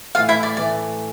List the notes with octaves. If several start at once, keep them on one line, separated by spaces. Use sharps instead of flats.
A2 E3 A3 F4 F5
E4 E5
D5
A2 E3 A3 D5